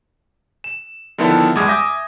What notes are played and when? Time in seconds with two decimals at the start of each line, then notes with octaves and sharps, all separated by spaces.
0.64 E7
1.18 D3 D#3 F3 B3 E4 A4
1.55 E2 G2 G#3 D6 D#6 G#6
1.68 E5 G#5 D6 D#6 G6 A#6